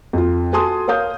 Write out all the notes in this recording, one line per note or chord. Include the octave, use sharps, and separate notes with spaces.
F2 F4
F#4 A4 G#5 A5 C6 D#6
A#4 C#5 F5 D#6 G6